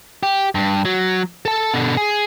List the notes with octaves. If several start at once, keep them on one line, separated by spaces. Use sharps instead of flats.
G4
G2
F#3
A4 A5
B2 D3
G#4